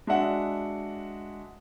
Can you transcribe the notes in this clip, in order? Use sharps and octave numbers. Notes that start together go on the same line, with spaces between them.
G#3 D4 F#4 E5 F#5